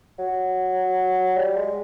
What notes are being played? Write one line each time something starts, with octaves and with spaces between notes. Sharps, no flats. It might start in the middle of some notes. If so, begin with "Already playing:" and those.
F#3
G3
G#3